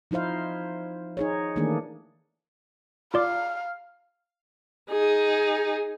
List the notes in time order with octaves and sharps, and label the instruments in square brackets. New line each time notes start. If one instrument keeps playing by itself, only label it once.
[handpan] F3 D#4 E4 C5 F5
D#4 G#4 C#5
D#3 E3 A3 A#3 D4 G#4
[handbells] F4 D5 D6 [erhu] F5
[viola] D#4 G#4